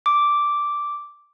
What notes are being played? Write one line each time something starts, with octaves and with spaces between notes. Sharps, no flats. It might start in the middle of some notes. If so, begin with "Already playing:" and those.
D6